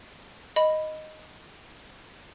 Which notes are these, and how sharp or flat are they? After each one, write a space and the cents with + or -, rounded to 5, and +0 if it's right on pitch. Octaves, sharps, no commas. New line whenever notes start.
D#5 +0 B5 +0